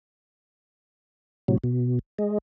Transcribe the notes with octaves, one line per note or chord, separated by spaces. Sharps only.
A2 C3 F#3
B2
G#3